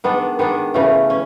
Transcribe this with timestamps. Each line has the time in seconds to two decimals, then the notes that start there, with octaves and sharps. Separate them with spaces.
0.04 D#3 G#3 B3 D4
0.39 D#3 G#3 B3 D4
0.74 C#3 E3 A3 C#4
1.10 C#4